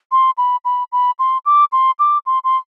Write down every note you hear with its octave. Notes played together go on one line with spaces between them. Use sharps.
C6
B5
B5
B5
C6
D6
C6
D6
C6
C6